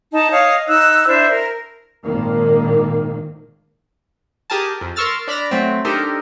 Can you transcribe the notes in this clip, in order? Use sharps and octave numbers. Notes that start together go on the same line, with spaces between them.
D#4 A5
C#5 D#5 F5 D#6
D#4 E6 F#6
D4 E4 C5 E5
A#4
G#1 A#2 D#3 A#3
G4 G#4 A#4 G#5 A5
F2
A#4 C6 C#6 E6 F6 A6
D4 D5 B5 F6 A#6
F#3 A3 C4
D4 D#4 G4 A4 A#4 C5